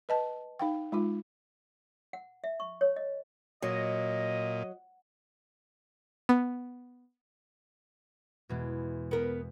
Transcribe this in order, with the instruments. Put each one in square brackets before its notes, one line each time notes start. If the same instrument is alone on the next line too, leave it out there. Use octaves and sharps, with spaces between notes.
[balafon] B4 D#5 A5
D#4 F5 G5
G#3 D#4 F4
[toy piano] F#5
E5
C#6
C#5
D#5
[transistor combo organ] A#2 [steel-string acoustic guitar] F#3 [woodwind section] D#5
[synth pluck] B3
[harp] E2 B2 G#3
[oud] B3 A#4